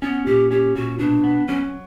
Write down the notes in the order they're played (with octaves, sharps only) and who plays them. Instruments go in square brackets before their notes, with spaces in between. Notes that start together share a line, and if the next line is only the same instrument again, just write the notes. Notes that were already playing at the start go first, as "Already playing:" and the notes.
[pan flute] B3 [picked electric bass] C#4
[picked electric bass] A#2 [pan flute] G4
[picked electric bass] C#4 [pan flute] G4
[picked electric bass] A#2 [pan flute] F#4
[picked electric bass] B2 [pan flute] D4
[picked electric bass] B3
[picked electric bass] F#3 [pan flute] C#4